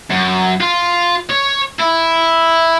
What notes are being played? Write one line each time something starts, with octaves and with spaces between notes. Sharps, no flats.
F#2
F4
C#5
E4